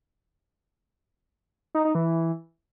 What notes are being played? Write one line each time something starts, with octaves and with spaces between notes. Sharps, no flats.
D#4
D#4
E3